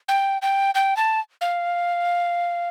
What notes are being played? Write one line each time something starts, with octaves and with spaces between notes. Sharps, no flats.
G5
G5
G5
A5
F5